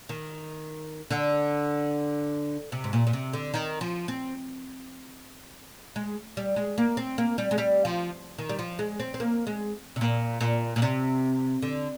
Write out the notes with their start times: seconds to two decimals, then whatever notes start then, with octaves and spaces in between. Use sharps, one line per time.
0.09 D#3
1.11 D3
2.72 C3
2.84 G#2
2.93 A#2
3.07 A#2
3.13 C3
3.33 D3
3.54 D#3
3.81 F3
4.08 C4
5.96 G#3
6.37 G3
6.56 G#3
6.78 A#3
6.97 C4
7.18 A#3
7.38 G3
7.51 G#3
7.58 G3
7.85 F3
8.39 D#3
8.49 G3
8.59 F3
8.79 G#3
9.00 C4
9.14 C4
9.20 A#3
9.47 G#3
9.96 C3
10.01 A#2
10.41 A#2
10.76 A#2
10.82 C3
11.62 D3